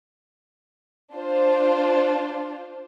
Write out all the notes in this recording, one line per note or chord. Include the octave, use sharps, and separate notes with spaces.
D4 F4 C5